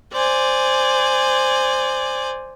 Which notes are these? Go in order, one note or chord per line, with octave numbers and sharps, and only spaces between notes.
C5 D5 G#5